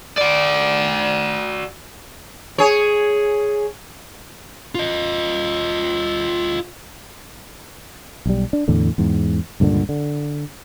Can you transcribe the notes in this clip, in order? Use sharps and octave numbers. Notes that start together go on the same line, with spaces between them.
F#4 D5
G#4 C#5
F4 D#5
B1 G3
D4
E2 A2 D3
E2 G#2
C#2 G2 A#2 D3
D3